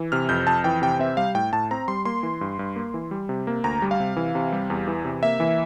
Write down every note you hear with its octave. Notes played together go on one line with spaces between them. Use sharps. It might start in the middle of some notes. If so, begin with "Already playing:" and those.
Already playing: E3
C3 F6
F2 G6
F2 A5
E3 G5
C3 G5
C4 E5
G3 F5
A2 G5
A2 A5
C4 A#5
G3 C6
A#3 C6
E3
G2
G2
A#3
E3
G3
C3
A#3
D2 A#5
G3
F5
C3
E3
C3
G3
E2
E3
C3
A#3 E5
E3